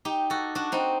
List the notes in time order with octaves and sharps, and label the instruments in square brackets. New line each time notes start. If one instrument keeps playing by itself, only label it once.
[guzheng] D#4 G4
F#4 A4
D4 F#4
C4 D#4